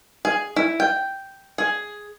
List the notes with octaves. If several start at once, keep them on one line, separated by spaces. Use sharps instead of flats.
G#4
E4
G5
G#4